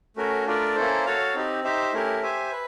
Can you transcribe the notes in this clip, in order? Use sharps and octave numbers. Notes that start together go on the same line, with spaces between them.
A3 C#4 F#4 A#4
A3 D4 F4 A#4 D5
A#3 C#4 E4 A4 C5
F#4 A4 C#5 F5
C4 D#4 G4
D#4 G4 C5 E5
A3 C#4 E4 G4 A#4
G4 C5 E5 G#5
B4